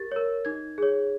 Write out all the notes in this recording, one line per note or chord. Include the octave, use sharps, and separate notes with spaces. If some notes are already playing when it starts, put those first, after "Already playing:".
Already playing: G4 A#4 A6
A#4 C#5
D#4 G#6
G#4 C#5